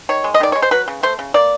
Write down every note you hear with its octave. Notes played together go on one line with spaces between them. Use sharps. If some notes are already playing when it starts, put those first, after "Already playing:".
D#3 C#5
G#3
D#5
D#3 D5
G#3 C#5
C5
F#3 B4
C#3
A3 C5
C#3
A#3 D5